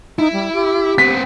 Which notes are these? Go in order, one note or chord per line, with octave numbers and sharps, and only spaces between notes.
D#4 E4
G3
G4
B3 C4 B6